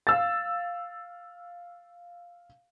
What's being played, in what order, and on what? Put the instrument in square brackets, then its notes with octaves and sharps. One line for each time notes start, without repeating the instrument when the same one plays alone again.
[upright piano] F5 E6 A6